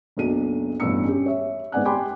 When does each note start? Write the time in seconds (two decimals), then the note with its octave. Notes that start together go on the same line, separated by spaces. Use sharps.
0.17 F#1 B1 F#3 D4 D#7
0.80 A1 G2 B2 D4 E6 C#7
1.04 C#4 G4
1.26 C#5 E5
1.72 G#2 B3 D5 F#5 G#5 F#6
1.85 G4 G5 G#5 B5 C6 D6